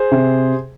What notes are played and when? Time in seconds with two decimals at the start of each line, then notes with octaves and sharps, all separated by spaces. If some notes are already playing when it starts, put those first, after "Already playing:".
Already playing: G#4 C5
0.11 C3